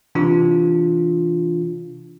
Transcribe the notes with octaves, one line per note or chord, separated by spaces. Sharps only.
C3 E3 D4 F4